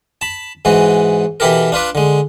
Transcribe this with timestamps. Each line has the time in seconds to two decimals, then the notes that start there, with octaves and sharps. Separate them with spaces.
0.21 A5 B5
0.65 G#2 E3 G#3 F#4
1.40 B2 E3 E4 G4 A4 A#4
1.72 D4 F4 B4 D5
1.95 D3 G#3